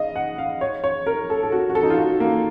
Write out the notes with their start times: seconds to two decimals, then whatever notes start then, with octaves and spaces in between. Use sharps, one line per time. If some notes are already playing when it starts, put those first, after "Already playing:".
Already playing: D#5 F5
0.16 F#5
0.38 F5
0.61 C#5
0.84 C#5
1.06 A#4
1.30 A4
1.43 A4
1.52 F#4
1.69 F#4
1.75 A4
1.83 D#4
1.90 F4
1.97 F#4
2.20 A#3